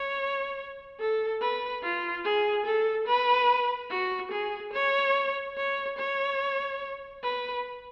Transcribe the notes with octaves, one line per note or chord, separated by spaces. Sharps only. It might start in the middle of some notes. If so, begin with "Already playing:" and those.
Already playing: C#5
A4
B4
F4
G#4
A4
B4
F#4
G#4
C#5
C#5
C#5
B4